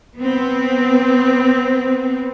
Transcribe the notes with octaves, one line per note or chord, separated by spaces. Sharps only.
B3 C4